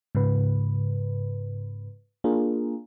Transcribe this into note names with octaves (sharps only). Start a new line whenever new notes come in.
G#2 C#3 B4
A#3 D4 F4 G#4 A#4